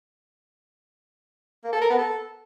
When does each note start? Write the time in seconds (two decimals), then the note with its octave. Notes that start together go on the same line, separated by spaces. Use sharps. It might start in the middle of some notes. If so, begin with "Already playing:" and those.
1.64 A#3
1.73 A4
1.81 A#4
1.90 B3
1.99 A4